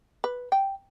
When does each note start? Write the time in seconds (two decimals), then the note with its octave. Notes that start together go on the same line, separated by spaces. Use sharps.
0.24 B4
0.52 G5